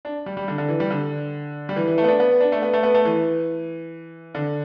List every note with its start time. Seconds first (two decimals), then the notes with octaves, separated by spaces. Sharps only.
0.05 D4
0.26 G3
0.37 G3
0.48 D3
0.58 D3
0.69 E3
0.80 G3
0.90 D3
1.69 G3
1.76 E3
1.87 E3
1.98 A3
2.04 B3
2.08 D4
2.20 B3
2.40 D4
2.52 A3
2.62 B3
2.73 A3
2.83 B3
2.94 A3
3.05 E3
4.35 D3